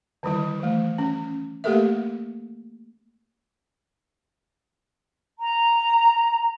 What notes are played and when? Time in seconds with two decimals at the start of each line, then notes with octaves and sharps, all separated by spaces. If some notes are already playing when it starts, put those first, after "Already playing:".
0.23 D3 D#3 G3 E4
0.60 E3 A3
0.98 C#4
1.64 A3 A#3 G4 A4 A#4 E5
5.39 A#5